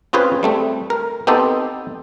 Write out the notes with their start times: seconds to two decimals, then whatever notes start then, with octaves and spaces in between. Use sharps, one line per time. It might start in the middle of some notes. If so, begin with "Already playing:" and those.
0.13 C4 C#4 F4 G#4 B4 C5
0.43 G3 A3 C4
0.90 A#4
1.27 B3 C4 D#4 G4 A4 C5